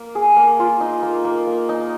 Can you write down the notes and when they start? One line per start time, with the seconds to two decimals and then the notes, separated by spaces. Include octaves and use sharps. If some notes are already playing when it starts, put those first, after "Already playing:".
Already playing: A#3
0.15 G#4
0.36 A#3
0.59 F4
0.81 D#4
1.03 A#3
1.25 A#3
1.47 A#3
1.69 D#4